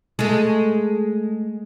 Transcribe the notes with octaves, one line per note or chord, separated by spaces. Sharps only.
G#3 A3